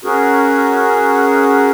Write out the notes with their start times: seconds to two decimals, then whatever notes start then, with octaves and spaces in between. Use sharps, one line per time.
0.05 C#4 F#4 G#4 A#4